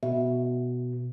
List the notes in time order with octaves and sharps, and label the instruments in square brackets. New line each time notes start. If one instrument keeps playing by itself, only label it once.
[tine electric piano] B2 [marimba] E5